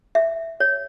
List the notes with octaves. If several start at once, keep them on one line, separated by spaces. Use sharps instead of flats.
E5
C#5